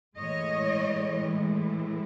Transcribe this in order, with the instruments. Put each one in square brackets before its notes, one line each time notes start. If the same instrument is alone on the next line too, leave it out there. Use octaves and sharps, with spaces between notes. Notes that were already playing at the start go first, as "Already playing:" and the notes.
[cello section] A2 E3 G#3 C#5 D#5